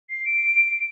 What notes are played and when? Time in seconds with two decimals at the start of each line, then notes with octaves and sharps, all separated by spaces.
0.09 C7
0.25 D7